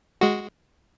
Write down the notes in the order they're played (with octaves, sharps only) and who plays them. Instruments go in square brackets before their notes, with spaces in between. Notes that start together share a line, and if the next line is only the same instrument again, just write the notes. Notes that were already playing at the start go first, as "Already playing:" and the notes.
[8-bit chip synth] G#3 F#4